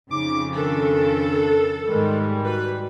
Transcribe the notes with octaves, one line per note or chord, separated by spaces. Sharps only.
F2 C#3 D#4 D6
D#3 D4 A4 A#4
G#2 D#3 G3 G#3
F#4 B4